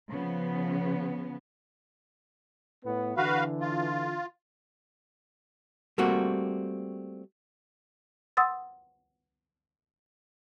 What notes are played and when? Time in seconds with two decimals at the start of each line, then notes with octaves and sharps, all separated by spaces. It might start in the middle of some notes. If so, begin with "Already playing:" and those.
0.10 C#3 F3 B3
2.85 A2 B3
3.17 D3 E3 F#4 B4 F5
3.61 F4
5.98 G3 A3 A#3 C4 F#4
8.37 F#5 C6 D#6 E6 A6